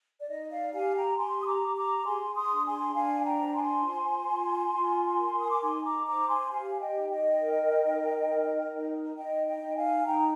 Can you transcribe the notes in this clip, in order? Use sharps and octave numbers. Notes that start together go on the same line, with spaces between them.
D5
D#4 D#5
D5 F5
G4 F5 G#5
G5 A#5
G4 G#5 C6
D#6
A#5 D6
G4
A#5 D6
G#4 G#5 C6
C6 D#6
D4
G#5 C6
D4 F5 G#5
G5 A#5
C5
G#5 C6
F4
F4
F4
A#4
D#6
D6
D#4 G#5 C6
A#5 D6
C5 A#5 D6
G#5 C6
G4 F5 G#5
D#5 G5
D#4
D#5 G5
A#4
D#4
A#4
D#4
D#4 D#5 G5
D#5 G5
D#4
F5 G#5
D#4 G5 A#5